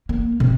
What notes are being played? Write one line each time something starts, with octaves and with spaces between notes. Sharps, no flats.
A#3
C3